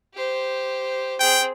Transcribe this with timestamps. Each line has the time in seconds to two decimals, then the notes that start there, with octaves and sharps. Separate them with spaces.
0.14 G4 C5
1.19 C4 G#4 G5